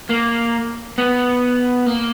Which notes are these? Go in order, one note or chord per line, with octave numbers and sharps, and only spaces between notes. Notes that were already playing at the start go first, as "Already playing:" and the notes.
A#3
B3
A#3